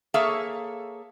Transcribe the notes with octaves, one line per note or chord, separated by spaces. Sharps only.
A#3 G#4 A4 C#5 E5 F5